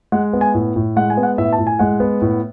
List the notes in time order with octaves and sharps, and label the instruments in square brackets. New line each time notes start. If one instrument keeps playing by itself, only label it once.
[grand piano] G#3 F#5
B3
G#5
A2
A2
G#3 F#5
G#5
B3
F#5
A2 E5
A5
A2
G#5
G#3 F#5
B3
A2